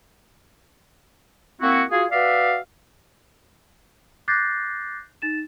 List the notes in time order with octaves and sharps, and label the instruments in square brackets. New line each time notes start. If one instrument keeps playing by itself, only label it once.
[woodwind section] A#3 C4 E4 F#4
F4 F#4 G#4
F#4 B4 D5 E5 F5
[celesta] D6 F#6 G6 A6 A#6 C7
D#4 A6 E7